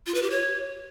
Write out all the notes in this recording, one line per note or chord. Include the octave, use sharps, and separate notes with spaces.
F4
B4
G4
C#5